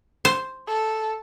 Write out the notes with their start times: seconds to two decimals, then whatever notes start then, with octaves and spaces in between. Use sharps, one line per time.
0.25 C5
0.68 A4